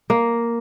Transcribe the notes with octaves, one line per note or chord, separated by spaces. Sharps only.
A#3